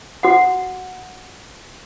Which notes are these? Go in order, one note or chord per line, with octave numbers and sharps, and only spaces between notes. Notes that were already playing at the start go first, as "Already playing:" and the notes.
F#4 F#5